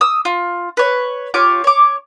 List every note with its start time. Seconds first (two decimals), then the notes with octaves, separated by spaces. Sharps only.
0.01 D#6 E6
0.25 F4
0.77 B4 C#5
1.34 F4 G4 C#5 D6
1.64 C#5 D6